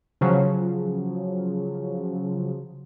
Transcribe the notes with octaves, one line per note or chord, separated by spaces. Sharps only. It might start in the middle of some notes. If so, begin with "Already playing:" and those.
C#3 F3 F#3